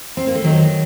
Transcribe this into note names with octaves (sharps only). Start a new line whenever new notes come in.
C4
A#3
A3
D#3 F#3